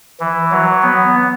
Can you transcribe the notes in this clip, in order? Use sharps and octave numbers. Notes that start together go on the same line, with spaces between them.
E3
F#3
B3